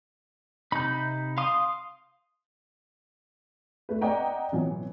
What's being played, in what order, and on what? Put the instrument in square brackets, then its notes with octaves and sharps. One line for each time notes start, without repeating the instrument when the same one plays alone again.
[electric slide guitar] C3 D#4 [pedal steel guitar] B5 G6
[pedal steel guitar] F5 C6 D#6
[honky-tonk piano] A3 B4
D5 D#5 F#5 G5 A#5
B2 E3 F#3